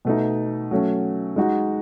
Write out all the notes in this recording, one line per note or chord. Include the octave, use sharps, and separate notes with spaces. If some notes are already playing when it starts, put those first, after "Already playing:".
B2 A3 D#4
F#3 A3 C#4
G#3 D#4 F#4